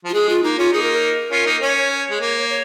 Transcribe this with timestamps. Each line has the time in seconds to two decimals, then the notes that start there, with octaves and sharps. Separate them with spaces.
0.04 F3 F4
0.14 G#3 G#4
0.29 F4
0.43 A#3 D#4
0.58 C#4 F4
0.72 A#3 D#4 G#4
0.82 A#4
0.92 A#4
1.31 C#4 F4
1.46 A#3 D#4
1.62 C#4 C#5
1.76 C#5
2.11 G#3
2.21 A#3
2.49 C#5